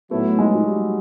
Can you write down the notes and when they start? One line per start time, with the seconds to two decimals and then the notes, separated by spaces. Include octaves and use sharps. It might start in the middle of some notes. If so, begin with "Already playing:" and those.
0.11 A2 F#3 A3 B3 E4
0.39 G#3
0.55 F#3
0.67 G3